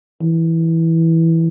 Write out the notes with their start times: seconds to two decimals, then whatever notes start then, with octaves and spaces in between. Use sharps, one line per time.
0.22 E3